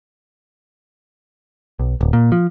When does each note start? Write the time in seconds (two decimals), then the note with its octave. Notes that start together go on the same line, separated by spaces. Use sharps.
1.79 B1
2.01 D1
2.13 A#2
2.32 F3